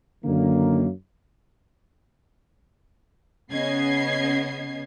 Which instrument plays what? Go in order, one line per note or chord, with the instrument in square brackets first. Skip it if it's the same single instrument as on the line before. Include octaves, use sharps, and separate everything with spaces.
[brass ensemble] F#2 D3 D#3 A#3
[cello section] C#3 B3 C#4 [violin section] D#5 G#6 C7